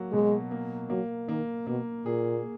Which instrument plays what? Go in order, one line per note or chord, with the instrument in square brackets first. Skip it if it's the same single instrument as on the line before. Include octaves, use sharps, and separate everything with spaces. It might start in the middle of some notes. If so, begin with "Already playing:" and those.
Already playing: [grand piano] F#3 A#3
[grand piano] B2 [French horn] G#3
[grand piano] A#3
[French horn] F#3 [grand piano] A#3
[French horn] D#3 [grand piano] A#3
[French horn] B2 [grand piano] A#3
[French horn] A#2 [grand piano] G#4